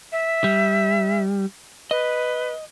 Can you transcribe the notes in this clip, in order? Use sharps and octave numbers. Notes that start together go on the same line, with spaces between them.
E5
G3
B4 D#5